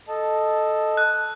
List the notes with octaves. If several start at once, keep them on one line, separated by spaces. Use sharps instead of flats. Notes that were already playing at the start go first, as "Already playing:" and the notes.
A4 D#5 A5
F#6